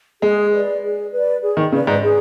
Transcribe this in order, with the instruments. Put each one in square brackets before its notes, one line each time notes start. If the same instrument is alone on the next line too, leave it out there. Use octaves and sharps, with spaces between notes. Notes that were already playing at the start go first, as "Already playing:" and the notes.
[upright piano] G#3 [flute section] G#4
[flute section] B4 D5
G#4
B4 D5
G#4
[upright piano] D#3
[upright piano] C#3 [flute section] B4 D5
[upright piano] G#2
[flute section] G#4